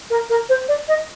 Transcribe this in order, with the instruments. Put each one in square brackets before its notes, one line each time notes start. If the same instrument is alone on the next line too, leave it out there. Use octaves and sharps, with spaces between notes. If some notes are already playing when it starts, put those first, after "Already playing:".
[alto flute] A#4
A#4
C5
D5
D#5